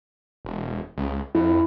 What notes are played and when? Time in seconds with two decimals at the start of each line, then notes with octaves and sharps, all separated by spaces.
0.45 E1
0.97 C#2
1.35 F2 E4